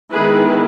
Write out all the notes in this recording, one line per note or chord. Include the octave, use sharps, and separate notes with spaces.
D#3 G#3 B3 E4 G#4 B4